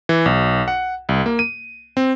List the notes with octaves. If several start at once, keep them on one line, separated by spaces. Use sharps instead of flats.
E3
B1
F#5
C2
A#3
D#7
C4